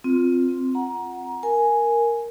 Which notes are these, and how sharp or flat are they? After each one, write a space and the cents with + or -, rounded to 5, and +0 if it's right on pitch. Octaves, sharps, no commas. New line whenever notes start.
C4 +0 F4 +0
F#5 +0 A#5 +20
A#4 +0 G#5 +0